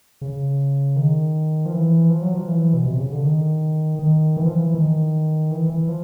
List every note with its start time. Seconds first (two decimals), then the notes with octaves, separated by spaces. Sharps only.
0.21 C#3
0.96 D#3
1.66 F3
1.73 E3
2.10 F3
2.22 F#3
2.34 F3
2.48 E3
2.73 B2
2.86 C3
2.98 C#3
3.11 D3
3.23 D#3
3.99 D#3
4.37 E3
4.46 F3
4.54 E3
4.75 D#3
5.51 E3
5.70 E3
5.88 F3